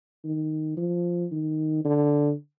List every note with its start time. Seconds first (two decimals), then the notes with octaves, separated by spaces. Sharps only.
0.24 D#3
0.77 F3
1.31 D#3
1.85 D3